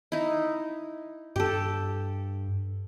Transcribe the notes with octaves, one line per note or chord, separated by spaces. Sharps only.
D#4 E4
G2 G4 A4